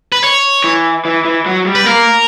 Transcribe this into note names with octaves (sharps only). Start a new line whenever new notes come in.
B4
C#5
E3
E3
E3
F#3
G3
B4
A#3 A#4